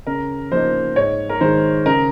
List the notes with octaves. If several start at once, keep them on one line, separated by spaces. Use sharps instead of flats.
C#3 A#4
F3 A#3 D#4 C5
G#2 C#5
A#4
D#3 G#3 C5
C#3 A#4